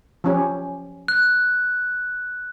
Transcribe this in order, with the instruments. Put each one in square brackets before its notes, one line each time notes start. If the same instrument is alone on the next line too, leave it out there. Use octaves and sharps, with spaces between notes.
[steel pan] F3 C#4 G4
[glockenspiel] F#6